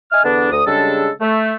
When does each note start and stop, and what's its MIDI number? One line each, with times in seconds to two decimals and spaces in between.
0.12 0.22 75
0.12 0.22 76
0.12 0.22 80
0.12 0.22 89
0.24 0.49 40
0.24 0.49 50
0.24 0.49 59
0.24 0.49 62
0.51 0.63 38
0.51 0.63 87
0.67 1.10 49
0.67 1.10 55
0.67 1.10 56
0.67 1.10 62
0.67 1.10 69
1.21 1.55 57